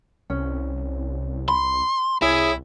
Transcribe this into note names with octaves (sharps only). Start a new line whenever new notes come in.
C2 C#4
B5 C6
C2 E4 G#4 C#5 E5